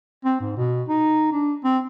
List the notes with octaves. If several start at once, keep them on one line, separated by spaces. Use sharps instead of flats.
C4
G#2
B2
D#4
D4
C4